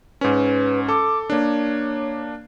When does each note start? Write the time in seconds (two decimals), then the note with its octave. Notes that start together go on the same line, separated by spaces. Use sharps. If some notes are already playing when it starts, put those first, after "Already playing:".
0.21 G#2 C#4 B4
0.88 A4 D6
1.30 A#3 D4 C#5